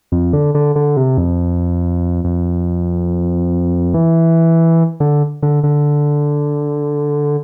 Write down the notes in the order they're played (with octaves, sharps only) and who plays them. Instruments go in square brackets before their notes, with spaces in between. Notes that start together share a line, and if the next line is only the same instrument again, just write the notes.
[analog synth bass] F2
D3
D3
D3
C3
F2
F2
E3
D3
D3
D3